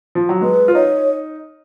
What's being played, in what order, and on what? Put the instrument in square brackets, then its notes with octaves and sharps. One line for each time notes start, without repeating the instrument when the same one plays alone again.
[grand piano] F3
F#3
[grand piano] G#3 [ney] B4
[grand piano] F4
[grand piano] D#4 [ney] C#5